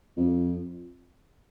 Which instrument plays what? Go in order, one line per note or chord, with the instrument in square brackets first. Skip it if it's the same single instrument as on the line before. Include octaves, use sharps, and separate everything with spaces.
[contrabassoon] F2